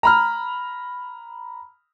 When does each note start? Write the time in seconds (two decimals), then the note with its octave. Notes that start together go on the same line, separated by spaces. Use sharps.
0.03 A#5 B5 F6